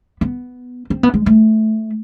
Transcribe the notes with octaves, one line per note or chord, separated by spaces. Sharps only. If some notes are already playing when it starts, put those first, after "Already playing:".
B3
C4
B3
G#3
A3